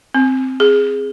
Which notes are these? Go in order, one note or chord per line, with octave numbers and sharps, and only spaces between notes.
C4
G#4